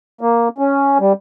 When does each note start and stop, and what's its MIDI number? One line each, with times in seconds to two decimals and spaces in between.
0.21 0.48 58
0.58 0.98 61
1.00 1.13 55